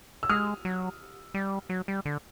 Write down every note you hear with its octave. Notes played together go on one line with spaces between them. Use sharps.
E6
G#3 D#6 F6
F#3
G3
F#3
G3
D3